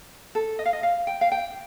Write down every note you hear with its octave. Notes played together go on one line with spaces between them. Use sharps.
A4
D#5
F5
D#5
F5
G5
F5
G5